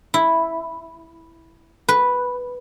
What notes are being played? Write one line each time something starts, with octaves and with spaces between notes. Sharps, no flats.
E4
B4